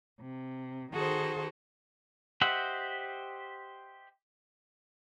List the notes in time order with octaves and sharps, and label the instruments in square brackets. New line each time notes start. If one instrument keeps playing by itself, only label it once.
[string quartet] C3
D#3 F#4 G#4 A4 C5
[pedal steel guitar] G4 C5 D#5 E5 F#5